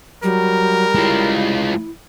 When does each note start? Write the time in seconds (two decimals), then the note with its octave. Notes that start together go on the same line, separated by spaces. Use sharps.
0.23 F#3 G3 A#4
0.95 G#3 E4 F4